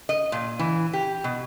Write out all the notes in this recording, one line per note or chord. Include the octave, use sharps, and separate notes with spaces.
D#5
A#2
E3
G4
B2